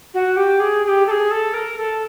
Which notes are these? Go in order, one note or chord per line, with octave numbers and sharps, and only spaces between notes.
F#4
G4
G#4
G#4
G4
A4
G#4
A4
A#4
A4